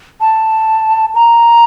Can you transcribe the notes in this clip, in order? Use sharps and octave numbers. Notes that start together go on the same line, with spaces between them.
A5
A#5